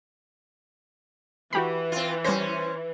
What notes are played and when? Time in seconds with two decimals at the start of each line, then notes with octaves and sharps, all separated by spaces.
1.53 E3 F#4 G4 B5
1.92 C4 F4
2.24 G3 C#4 C5 A#6